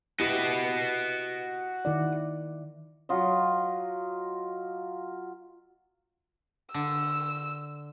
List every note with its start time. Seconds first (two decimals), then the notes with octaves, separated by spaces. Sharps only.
0.20 E4 F#4 G4 D#5
1.85 D#3 E4 D5
3.09 F#3 F4 D#5
6.74 D3 E6